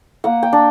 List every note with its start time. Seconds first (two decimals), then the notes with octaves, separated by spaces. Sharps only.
0.24 A#3 F#5
0.43 G5
0.53 D4